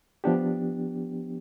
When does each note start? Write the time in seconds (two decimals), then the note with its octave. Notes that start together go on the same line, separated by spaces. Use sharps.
0.24 F3 B3 D4 G4